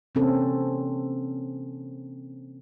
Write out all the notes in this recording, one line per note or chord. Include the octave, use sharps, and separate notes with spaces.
C3 E3 A#3 C4 C#4 A4